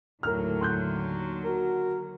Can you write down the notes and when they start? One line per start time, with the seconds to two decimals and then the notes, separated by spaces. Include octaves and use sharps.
0.23 D#2 A2 D3 F#3 A#4 F6
0.61 C6 F#6 G6
1.45 F#4 A#4